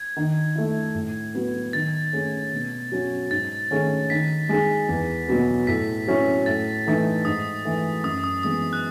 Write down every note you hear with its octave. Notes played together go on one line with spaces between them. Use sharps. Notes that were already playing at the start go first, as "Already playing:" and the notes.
Already playing: G#6
D#3
A3 E4
A2
F#3 B3 F#4
D#3 A6
A3 C#4 G#4
B2
F#3 C#4 F#4
G#2 A6
D#3 A3 C#4 G#4
D#3 B6
G#3 D#4 G#4
E2
B2 F#3 B3
A2 B6
F#3 C#4 E4
A2 A6
E3 A3 D#4
G#2 D#6
E3 A3
F#2 D#6
D#6
E3 G#3 B3 D#6
F#6